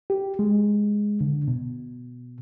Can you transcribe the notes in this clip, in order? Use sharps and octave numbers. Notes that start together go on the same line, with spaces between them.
G4
G#3
D3
B2